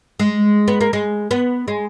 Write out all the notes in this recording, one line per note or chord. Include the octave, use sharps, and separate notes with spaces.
G#3
B3
A#3
G#3
B3
G#3